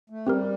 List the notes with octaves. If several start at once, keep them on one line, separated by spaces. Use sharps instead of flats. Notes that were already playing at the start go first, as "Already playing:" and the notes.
A3
G3 C4 G4 A#4